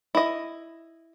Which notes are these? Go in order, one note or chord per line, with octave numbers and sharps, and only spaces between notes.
E4 D#5